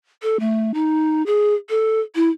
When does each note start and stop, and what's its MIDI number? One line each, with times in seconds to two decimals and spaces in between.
0.22 0.39 69
0.40 0.74 57
0.74 1.24 63
1.26 1.53 68
1.70 2.00 69
2.15 2.29 64